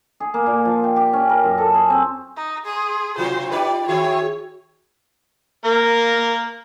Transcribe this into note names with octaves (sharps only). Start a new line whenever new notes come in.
G#4
A#3
A#2
F3
G5
G4
C#4
A#4
F#2
A4
G#4
C4
D#4
G#4 C6
C3 F#3 F4 F#4 C5
D#4 G4 B4 D5 G5
D#3 E4 F#4 G#4 C#5
A#3 A#4